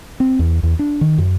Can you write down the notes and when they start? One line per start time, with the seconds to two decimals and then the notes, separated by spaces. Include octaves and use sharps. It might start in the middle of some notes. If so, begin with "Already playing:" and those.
0.20 C4
0.39 E2
0.63 E2
0.79 D4
1.01 D#3
1.18 F#2